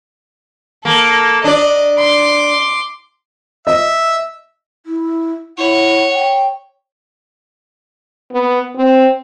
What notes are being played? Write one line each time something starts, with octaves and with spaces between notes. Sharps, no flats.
A#3 A4
D4 D5 D#5
C6 D6
D#5 E5
E4
E4 C#5 F#5
G5
B3
C4